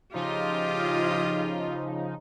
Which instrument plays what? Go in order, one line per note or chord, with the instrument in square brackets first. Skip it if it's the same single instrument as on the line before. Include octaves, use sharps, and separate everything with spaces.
[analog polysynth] C#3 F3 D#4 [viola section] F4 [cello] G4 D#5